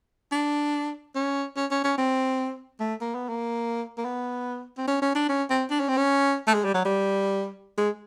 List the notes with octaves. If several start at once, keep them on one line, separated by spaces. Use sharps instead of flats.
D4
C#4
C#4
C#4
C#4
C4
A3
A#3
B3
A#3
A#3
B3
C4
C#4
C#4
D4
C#4
C4
D4
C#4
C4
C#4
A3
G#3
G3
F#3
G3
G#3